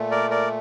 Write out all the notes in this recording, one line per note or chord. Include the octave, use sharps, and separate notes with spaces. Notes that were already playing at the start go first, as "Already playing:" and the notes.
Already playing: A#2 A3
A#4 D5
A#4 D5